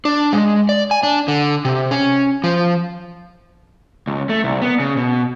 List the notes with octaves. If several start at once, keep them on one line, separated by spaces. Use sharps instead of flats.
D4
G#3
D5
G#5
D4
D3
C3
C#4
F3
C#2
A3
C2
B3
C#3
B2